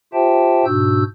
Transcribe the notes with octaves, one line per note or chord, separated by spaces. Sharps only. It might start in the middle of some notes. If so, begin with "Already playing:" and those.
F4 G4 C5 E5 G5 A5
G#2 B2 D4 F#4 E6 G6